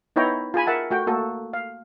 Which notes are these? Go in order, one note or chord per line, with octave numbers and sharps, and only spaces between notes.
B3 D#4 E4 C#5 G5 A#5
F4 G#4 G#5 B5
A#4 E5 F#5 A5
A3 F#4 G5
A3 A#3 F#4 A4
F5